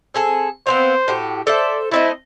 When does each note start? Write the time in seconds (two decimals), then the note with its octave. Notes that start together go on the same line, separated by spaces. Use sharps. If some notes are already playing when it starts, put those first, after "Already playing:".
0.14 C4 G#4 A4
0.67 B3 C4 C5 F5
1.08 A2 F#4 G4
1.47 A4 C5 D5 E5
1.91 A3 C4 E4 D#5